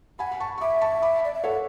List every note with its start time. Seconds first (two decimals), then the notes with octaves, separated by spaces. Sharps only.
0.19 F#5 G#5 B5
0.31 B5
0.40 A5 C#6
0.58 C#6
0.61 E5 B5 D6
0.81 A5 C#6
1.02 B5 D6
1.25 D5
1.34 E5
1.44 A4 C#5 F#5